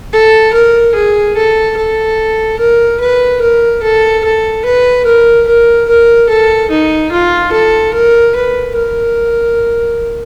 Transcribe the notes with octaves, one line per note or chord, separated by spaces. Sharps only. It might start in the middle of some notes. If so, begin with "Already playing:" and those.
A4
A#4
G#4
A4
A4
A#4
B4
A#4
A4
A4
B4
A#4
A#4
A#4
A4
D#4
F4
A4
A#4
B4
A#4